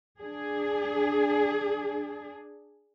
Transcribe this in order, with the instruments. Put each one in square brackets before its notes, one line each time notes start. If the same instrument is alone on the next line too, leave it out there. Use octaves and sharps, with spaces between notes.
[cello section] D4 G#4